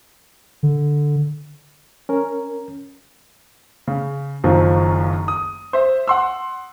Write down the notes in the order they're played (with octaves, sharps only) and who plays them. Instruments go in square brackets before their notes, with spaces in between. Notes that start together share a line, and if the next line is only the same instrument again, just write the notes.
[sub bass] D3
[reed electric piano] C#4 A#4
[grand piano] C#3
F#1 F#2 D#3 F3
D#6
C5 E5
F#5 C6 E6